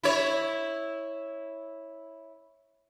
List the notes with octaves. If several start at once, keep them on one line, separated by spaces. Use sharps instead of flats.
E4 C#5